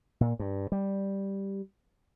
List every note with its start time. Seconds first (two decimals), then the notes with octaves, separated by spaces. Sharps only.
0.21 A#2
0.39 G2
0.72 G3